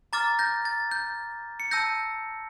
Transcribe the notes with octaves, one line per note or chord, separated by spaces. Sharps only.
A#5 D6 F6 A6
G6 A#6
A6
G6
C#7
A5 E6 G6 A#6